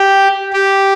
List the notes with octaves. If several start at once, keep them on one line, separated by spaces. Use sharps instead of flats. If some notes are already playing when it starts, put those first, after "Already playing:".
Already playing: G4
G4